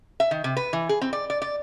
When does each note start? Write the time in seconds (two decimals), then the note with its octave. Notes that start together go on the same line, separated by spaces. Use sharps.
0.20 E5
0.31 D#3
0.44 C3
0.57 B4
0.73 E3
0.89 G#4
1.01 C4
1.13 D5
1.30 D5
1.42 D5